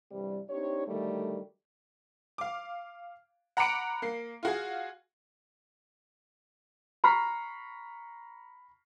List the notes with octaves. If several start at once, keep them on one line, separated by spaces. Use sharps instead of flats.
G2 C3 E3 G3
C4 D4 D#4 G4 C#5
D3 D#3 F#3 G3 A3
F5 D6
F#5 A#5 B5 D6 C#7 D7
A#3 C7
F4 F#4 G#4
A#5 B5 C#6 F6 B6 C7